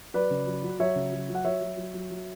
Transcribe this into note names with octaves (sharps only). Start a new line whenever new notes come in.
F#3 B4 D5
C#3
F#3
F#3
F#3 C#5 E5
C#3
F#3
F#3
F#5
F#3 C#5 E5
F#3
F#3
F#3
F#3